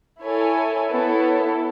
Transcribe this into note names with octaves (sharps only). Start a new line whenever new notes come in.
E4 A4 C#5 G#5
B3 E4 A4 C#5